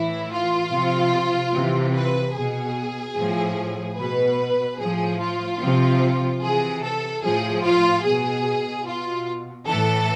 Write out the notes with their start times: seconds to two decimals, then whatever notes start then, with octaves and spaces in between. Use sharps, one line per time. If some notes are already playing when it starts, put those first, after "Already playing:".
Already playing: A2 E3 E4
0.32 F4
0.72 C3 F3
1.53 C3 E3
1.95 B4
2.35 B2 G#4
3.16 A2 F3
3.98 B2 B4
4.79 A2 F3 G#4
5.20 F4
5.60 C3 F3
6.42 C3 E3 G#4
6.83 A4
7.23 A2 F3 G#4
7.64 F4
8.04 B2 G#4
8.86 B2 F4
9.67 A2 E3 A4